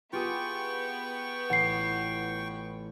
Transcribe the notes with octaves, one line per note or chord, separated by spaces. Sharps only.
B3 F4 G4 G#4 G5 C#6
A1 F#5 C7